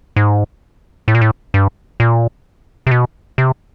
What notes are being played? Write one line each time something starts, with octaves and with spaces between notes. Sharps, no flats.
G#2
A2
A#2
A2
G2
A#2
C3
B2
C3